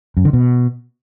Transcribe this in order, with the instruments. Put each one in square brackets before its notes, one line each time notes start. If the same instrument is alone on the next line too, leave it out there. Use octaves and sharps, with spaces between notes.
[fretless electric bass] F#2
D3
B2